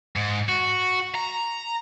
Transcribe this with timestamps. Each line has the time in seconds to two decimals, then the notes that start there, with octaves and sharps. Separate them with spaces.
0.16 G#2
0.49 F#4
1.15 A#5